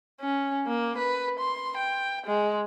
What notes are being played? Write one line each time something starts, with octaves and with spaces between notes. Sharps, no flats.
C#4
A#3
B4
C6
G5
G#3